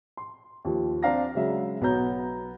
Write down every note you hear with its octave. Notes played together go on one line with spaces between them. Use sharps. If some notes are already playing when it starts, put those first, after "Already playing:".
C6
D#2 F3
C4 D4 F5 A#5 A#6
C#3 F#3 G#3 E5
B1 B3 F#4 C#5 A#5 G6